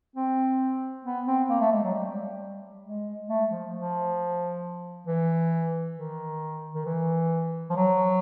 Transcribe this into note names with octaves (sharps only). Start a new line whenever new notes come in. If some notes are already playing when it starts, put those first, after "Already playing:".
C4
B3
C4
A#3
A3
G#3
F#3
G3
G#3
A3
F3
F3
E3
D#3
D#3
E3
F3
F#3